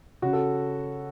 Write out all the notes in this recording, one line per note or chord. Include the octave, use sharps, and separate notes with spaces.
C#3 F#4
A4